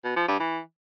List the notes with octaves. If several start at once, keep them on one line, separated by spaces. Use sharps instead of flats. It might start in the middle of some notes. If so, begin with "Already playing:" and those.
B2
F3
G2
E3